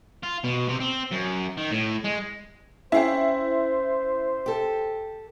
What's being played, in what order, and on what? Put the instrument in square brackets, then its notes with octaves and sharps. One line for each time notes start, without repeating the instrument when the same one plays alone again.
[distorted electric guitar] F4
B2
C3
C4
F#2
D#3
A2
G#3
[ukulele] C#4 F5 G5 [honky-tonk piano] E4 [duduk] C5
[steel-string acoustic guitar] G4 A4